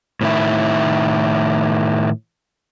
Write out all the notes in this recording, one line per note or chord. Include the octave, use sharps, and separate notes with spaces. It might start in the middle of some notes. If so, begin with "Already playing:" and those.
A2 D#3 E4